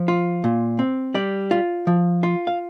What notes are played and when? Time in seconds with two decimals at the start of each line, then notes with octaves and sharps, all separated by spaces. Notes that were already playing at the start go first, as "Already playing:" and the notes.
Already playing: F3
0.08 F4
0.44 A#2
0.79 C4
1.14 G3 D5
1.51 F4
1.87 F3
2.23 F4
2.47 F5